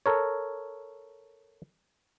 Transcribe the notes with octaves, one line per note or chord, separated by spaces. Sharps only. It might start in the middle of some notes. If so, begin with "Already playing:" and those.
A4 A#4 C#5